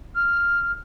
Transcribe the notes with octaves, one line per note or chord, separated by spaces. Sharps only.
F6